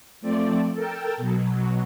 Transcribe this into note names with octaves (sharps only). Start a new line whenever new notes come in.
F3 A3 C4 D5
A4 A#4 G5 A5
B2 F#3